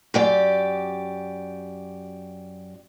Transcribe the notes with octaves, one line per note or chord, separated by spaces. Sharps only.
F#2 G4 D5